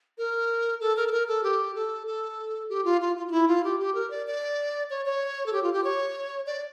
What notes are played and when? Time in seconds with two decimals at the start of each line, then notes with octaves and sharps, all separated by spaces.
0.18 A#4
0.81 A4
0.96 A#4
1.07 A4
1.12 A#4
1.27 A4
1.44 G4
1.75 A4
2.07 A4
2.69 G4
2.85 F4
3.01 F4
3.17 F4
3.27 F4
3.32 E4
3.48 F4
3.64 G4
3.80 G4
3.95 A#4
4.10 D5
4.27 D5
4.90 C#5
5.05 C#5
5.46 A4
5.53 G4
5.63 F4
5.73 G4
5.84 C#5
6.46 D5